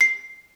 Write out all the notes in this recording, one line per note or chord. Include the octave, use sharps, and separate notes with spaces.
C7